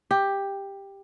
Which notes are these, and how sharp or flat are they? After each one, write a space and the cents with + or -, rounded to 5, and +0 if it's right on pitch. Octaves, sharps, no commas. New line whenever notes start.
G4 +10